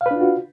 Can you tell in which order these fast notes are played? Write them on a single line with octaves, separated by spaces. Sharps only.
F5 B4 D4 F4 F#4